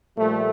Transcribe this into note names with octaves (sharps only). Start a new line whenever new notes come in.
A#2 F3 G3 A3